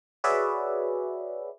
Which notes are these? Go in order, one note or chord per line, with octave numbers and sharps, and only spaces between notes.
F#4 G#4 B4 C#5 D5 E5